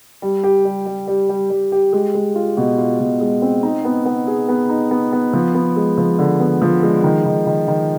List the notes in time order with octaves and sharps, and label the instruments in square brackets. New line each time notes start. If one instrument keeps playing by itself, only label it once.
[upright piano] G3
G4
G3
G3
G3
G3
G3
G4
G#3
G#3
F4
B2
F4
B2
G#3
C4
D#4
B3
B3
G#4
B3
D#4
B3
B3
F3
B3
G#3
F3
D3
B3
F3
G#3
D#3
D#3
D#3
D#3